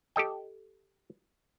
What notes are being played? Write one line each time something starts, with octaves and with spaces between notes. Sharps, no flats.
G4 A4 D#5 G5